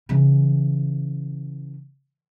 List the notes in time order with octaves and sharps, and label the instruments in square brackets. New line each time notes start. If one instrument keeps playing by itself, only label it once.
[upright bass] C#3 E3